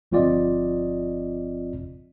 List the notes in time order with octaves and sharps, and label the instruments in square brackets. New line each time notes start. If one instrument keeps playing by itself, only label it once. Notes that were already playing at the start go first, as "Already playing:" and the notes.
[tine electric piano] G1 F3 C4 F4 D5 D#5